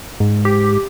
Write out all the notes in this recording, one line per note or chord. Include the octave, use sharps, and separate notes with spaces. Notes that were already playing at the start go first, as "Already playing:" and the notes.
G#2
G4